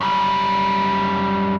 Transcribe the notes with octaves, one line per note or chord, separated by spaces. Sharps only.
F#2 G3